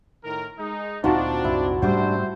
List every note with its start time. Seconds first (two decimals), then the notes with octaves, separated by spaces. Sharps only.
0.24 A2 D#3 A#4
0.58 G#3 D#4
1.04 D2 A#2 C4 D4 D#4 F4 F#4 A5
1.44 C2 F#2 A#2 E4
1.82 G#2 C3 G3 A3 C#4 D4 C5 F#5